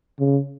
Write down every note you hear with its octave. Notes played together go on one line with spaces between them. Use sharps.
C#3